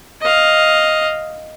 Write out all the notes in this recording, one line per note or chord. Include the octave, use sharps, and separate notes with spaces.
D#5 F5